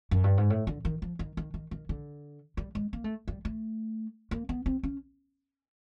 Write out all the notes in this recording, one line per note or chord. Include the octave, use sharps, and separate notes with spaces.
F#2
G2
G#2
A2
D3
D#3
F3
D#3
D#3
D#3
D#3
D3
G3
G#3
A#3
A3
G3
A3
A#3
B3
C4
C#4